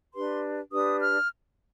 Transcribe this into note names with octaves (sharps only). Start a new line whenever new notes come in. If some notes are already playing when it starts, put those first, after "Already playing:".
D4 G4 B4 C6
D4 G4 B4 D#6
F6